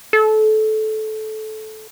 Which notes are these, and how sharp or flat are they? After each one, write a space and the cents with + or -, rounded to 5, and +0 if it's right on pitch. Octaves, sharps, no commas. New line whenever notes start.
A4 -20